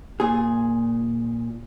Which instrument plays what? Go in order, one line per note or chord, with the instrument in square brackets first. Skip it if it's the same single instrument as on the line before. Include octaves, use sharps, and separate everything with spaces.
[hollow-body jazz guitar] A#2 G#4